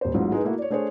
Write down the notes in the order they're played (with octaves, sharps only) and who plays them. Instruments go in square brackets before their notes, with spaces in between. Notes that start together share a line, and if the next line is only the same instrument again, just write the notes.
[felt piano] D#1 C5
A1 G#2 F#3 F4
G#3 D#4 B4
A3 A#3 E4 F#4
C#5 D5
A3 D4 G#4 C5 C#5